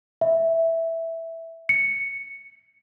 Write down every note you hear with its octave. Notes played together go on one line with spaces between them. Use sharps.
E5
C#7